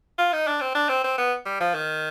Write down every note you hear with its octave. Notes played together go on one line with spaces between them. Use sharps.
F4
D#4
D4
C4
D4
C4
C4
B3
G3
F3
D#3